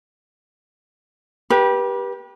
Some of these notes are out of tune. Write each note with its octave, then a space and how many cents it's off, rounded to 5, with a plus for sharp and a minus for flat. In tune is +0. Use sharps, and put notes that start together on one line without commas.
G4 +0 B4 -35